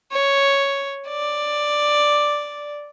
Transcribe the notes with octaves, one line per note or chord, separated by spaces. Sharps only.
C#5
D5